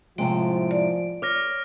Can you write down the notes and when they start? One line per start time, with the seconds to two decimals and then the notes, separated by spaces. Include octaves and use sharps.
0.18 A2 C3 F3 G#3 G5 D7
0.71 D5
1.22 C#5 D6 F6 A#6